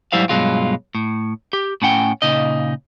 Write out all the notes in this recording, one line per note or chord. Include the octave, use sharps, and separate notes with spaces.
G#2 F#3 G3 E4 C5 F5
G2 B2 F#3 G#3 F4
A2
G4
A2 C#4 F#5 G5
A#2 C#3 D#4 D#5